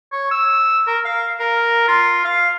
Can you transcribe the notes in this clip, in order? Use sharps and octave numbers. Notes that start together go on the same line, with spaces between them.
C#5
E6
A#4
F5
A#4
F4
F5